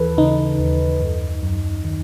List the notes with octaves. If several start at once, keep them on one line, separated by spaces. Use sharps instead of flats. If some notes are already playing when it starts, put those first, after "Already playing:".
Already playing: D#2 E3 A4 B4
C#3 D#4
D#2
F#2
F#2
D#3